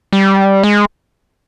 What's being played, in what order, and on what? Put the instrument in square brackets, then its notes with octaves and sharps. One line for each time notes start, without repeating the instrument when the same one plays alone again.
[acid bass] G3
G#3